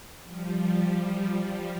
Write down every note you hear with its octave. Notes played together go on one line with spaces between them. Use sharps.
F3 G3